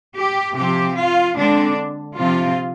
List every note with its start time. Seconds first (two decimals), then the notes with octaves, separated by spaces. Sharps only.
0.15 G4
0.55 C3 F3 C4 G4
0.96 F4
1.37 D3 G#3 C4 D4
2.17 C3 F3 C4 F4